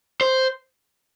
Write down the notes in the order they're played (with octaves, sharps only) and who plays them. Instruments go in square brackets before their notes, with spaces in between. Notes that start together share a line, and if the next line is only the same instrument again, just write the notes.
[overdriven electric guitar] C5